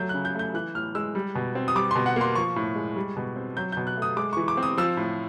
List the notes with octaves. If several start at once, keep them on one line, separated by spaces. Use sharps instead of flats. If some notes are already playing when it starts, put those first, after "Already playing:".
Already playing: F#3 A3 G6
C#3 F#6
G6
A3 G6
E3 F#6
A2 F6
G#3 E6
G3
B2
C4
D#6
G3 D6
B2 C6
F#5
A#3 C6
F3 C#6
A2
G#3
G3
B2
C4
F#3 G6
B2 G6
F#6
A3
D#6
G#3 D6
E3 C#6
D6
C4
D#6
F3 E6
A2